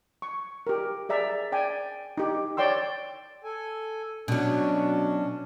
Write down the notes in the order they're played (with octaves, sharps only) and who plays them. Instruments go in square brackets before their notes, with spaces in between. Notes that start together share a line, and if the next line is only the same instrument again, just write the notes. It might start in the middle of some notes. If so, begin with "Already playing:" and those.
[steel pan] C#6
G4 A#4
G#4 D5 E5 A#5
D5 G5 G#5
D#4 G4
C#5 D5 G5 C6 E6
[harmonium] A4 G#5
[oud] B2 F#3 [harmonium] C#4 D4